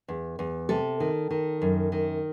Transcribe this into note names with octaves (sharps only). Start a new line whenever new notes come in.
E2
E2
C3 A4
D#3
D#3
F#2
D#3